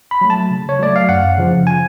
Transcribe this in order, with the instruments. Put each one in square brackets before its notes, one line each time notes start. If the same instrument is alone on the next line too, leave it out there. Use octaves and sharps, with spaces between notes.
[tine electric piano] B5
F#3 A3
A5
C#3
C#5
F#3 A3 D5
F5
F#2 F#5
C#3 F3
G#5